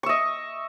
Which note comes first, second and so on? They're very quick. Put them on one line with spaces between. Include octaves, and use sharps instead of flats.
C#6 E5 D#5